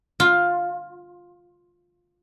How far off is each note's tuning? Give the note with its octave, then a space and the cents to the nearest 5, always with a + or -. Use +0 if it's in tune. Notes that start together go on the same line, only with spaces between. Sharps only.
F4 +10